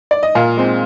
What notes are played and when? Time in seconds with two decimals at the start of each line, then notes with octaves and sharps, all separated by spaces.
0.11 D5
0.23 D#5
0.35 A#2 F5
0.57 G#3 C4